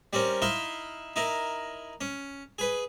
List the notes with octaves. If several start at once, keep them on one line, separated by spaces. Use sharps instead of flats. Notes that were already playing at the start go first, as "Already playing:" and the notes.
G3 C4 C#4 A#4
D#4 E4 E5 F5 C6
D#4 E4 A#4
C#4
G#4 B4